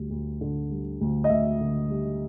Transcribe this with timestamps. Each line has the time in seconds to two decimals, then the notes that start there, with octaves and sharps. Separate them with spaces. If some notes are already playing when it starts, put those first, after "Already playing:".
Already playing: D2 G3
0.10 D2
0.41 D3
0.71 G3
1.01 D2
1.24 D#5
1.30 D2 E5
1.60 D3
1.90 G3